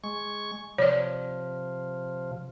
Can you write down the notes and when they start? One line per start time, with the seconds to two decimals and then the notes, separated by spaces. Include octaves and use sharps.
0.04 G#3 C#6
0.78 C3 F3 C#5 D5